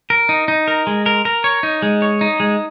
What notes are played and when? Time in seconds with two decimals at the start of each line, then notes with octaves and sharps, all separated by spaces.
0.10 A#4
0.29 D#4
0.48 D#4
0.68 A#4
0.87 G#3
1.06 A#4
1.25 A#4
1.44 C#5
1.63 D#4
1.82 G#3
2.02 C#5
2.21 D#4
2.40 G#3